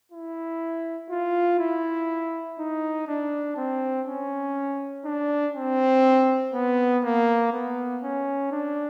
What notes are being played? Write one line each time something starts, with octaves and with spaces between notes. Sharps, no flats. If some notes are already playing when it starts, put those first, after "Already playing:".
E4
F4
E4
D#4
D4
C4
C#4
D4
C4
B3
A#3
B3
C#4
D4